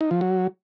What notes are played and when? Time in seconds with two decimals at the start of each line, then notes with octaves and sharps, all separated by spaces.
0.01 D#4
0.11 F3
0.21 F#3